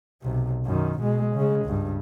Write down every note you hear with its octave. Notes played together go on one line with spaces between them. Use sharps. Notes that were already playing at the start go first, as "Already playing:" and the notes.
B1 C3
F#2 D#3
B2 G#3
C#3 G#3
C#2 G2